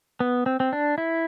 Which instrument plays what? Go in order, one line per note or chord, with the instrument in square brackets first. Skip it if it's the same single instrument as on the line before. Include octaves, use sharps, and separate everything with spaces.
[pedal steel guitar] B3
C4
C4
D4
E4